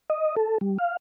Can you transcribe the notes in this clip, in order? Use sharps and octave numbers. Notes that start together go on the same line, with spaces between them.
D#5
A4
G3
F5